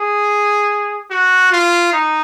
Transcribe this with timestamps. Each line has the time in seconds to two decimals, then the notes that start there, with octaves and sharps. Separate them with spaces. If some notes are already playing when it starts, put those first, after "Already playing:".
Already playing: G#4
1.10 F#4
1.52 F4
1.93 D#4